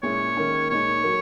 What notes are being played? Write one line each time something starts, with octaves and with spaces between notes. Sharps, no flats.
A#2 G#3 C#4 E4 C#5
D#3 A#3 C#4
A#2 G#3 D#4 C#5
F#3 A#3